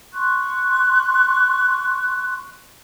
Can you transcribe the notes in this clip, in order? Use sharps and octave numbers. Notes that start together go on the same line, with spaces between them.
C6 C#6 F#6